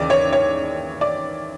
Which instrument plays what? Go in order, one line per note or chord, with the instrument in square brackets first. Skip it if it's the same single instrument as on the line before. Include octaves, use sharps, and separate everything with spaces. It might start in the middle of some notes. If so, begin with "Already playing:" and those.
Already playing: [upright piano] D#2 C#3 E3 D5
C#5
C#5
D5